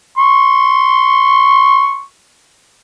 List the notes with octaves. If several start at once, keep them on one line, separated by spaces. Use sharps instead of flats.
C6 C#6